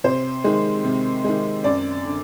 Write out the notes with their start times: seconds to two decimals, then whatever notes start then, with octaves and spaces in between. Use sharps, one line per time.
0.04 C3 C5
0.44 D#3 G#3
0.85 C3
1.24 D#3 G#3
1.64 F#2 D5
2.05 D3